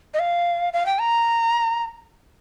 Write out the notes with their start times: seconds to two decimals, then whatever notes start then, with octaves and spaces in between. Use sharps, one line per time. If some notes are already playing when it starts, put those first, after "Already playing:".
0.14 D#5
0.19 F5
0.73 F5
0.86 G5
0.99 A#5